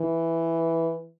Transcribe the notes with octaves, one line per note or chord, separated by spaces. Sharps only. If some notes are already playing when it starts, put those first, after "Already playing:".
Already playing: E3